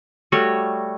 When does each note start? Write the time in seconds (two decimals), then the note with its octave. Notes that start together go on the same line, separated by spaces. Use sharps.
0.32 G3 A3 F#4 C#5